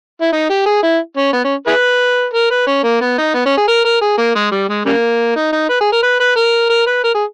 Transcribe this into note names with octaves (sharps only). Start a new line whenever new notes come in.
E4
D#4
G4
G#4
E4
C#4
B3
C#4
E4 G#4 B4
A#4
B4
C#4
A#3
B3
D#4
B3
C#4
G#4
A#4
A#4
G#4
A#3
G#3
G3
G#3
C#3 G3 A#3
D#4
D#4
B4
G#4
A#4
B4
B4
A#4
A#4
B4
A#4
G#4